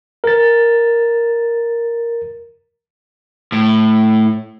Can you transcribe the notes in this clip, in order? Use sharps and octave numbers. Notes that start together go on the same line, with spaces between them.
A#4 A6
A2